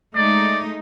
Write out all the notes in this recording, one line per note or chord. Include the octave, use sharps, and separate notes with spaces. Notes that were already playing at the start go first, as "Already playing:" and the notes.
G#3 A3 D#4 D5